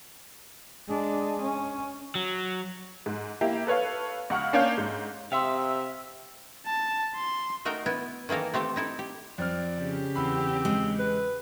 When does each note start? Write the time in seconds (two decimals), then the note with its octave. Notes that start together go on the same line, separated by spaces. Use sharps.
0.88 G#3 D4
1.42 C#4
2.15 F#3
3.06 G#2
3.41 A#3 E4 G4
3.67 A4 B4 C#5 F5
4.30 C#2 F#5 C#6 F6
4.53 A#3 C#4 D4 C#5 F5 G6
4.78 G#2
5.32 C3 E5 F5 G5 C6 D#6 E6
6.66 A5
7.15 C6
7.65 A3 D#4 F#4 A#4 G5
7.86 B3 E4
8.29 D#3 E3 A#3 A4 A#4
8.54 A3 C4 G4 A4
8.76 D#4 E4 A4
8.99 G4
9.38 F2 C4 D5 F6
9.77 C#3 G4
10.15 E2 C4 B5
10.65 G#3
10.99 B4